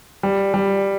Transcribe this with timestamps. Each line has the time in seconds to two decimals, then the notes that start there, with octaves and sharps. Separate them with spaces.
0.23 G3
0.54 G3